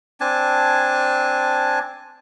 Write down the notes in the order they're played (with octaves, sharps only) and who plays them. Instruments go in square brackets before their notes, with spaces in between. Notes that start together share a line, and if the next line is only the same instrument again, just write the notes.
[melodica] C4 D4 G#5 A5